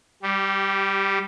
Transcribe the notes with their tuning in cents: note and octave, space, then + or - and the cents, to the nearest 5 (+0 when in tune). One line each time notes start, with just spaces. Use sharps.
G3 +0 G4 -25